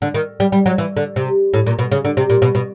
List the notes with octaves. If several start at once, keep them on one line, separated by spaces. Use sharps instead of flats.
D3
D#3
G3
G3
F#3
E3
D3
C3
A2
A#2
B2
C#3
D3
C3
A#2
B2
B2